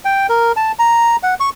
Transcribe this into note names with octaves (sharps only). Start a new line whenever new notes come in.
G5
A#4
A5
A#5
F#5
C#6